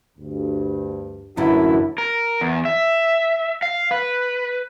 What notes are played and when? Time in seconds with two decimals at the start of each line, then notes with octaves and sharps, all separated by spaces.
0.18 D2 G2
1.37 A1 F#2 D3 E3 A#3 E4 F#4
1.98 A#4
2.41 E2
2.65 E5
3.62 F5
3.91 B4